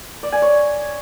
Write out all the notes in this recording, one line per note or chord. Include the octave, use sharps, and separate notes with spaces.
D5
G#5
C#5